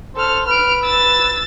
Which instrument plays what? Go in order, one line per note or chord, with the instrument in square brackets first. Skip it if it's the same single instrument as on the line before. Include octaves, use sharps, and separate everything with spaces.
[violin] A4 F6 [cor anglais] C5
[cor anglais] B4 [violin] F6 D7
[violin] E6 A6